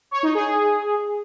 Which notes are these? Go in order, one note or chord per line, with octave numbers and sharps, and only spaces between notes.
C#5
D#4
G#4